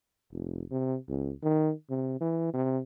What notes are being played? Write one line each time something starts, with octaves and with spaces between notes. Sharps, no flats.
F1
C3
C#2
D#3
C3
E3
C3